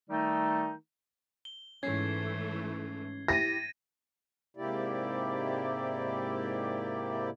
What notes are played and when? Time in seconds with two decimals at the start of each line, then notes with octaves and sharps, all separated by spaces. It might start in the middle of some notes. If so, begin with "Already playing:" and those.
0.10 D#3 G3 A3 D#4
1.45 G7
1.83 G#2 E3 A3 C#4 G#6 C7
3.28 E4 G4 A6 A#6 D#7
4.57 G#2 C3 A#3 E4 G4 D5